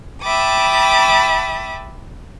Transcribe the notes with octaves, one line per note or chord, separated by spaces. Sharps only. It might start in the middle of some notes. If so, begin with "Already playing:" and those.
E5 G5 A5 B5 D6 D#6